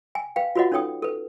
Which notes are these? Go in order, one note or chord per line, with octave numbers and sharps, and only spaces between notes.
G5 G#5
B4 F5 G5
F4 F#4 B4 C#5 D#5 F#5
C#4 D#4 A4 C#5 G5 D#6
A4 B4